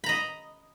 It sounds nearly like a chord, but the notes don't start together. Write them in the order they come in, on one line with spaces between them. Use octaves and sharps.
B5 A#5 D#5